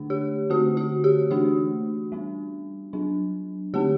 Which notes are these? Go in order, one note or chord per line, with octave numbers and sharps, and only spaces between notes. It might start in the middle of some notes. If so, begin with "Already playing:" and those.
Already playing: D3 A3 D4
G4
D3 A3 C4 F#4
F#4
G4
E3 A3 D4 F#4
G3 B3 D4
F#3 B3 D4
D3 A3 C4 G4